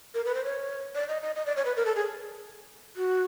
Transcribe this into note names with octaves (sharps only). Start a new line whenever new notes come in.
A#4
B4
C5
C#5
D5
D#5
D#5
D#5
D5
C#5
B4
A#4
A4
G#4
F#4